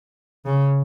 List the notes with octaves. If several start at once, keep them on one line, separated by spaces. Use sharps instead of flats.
C#3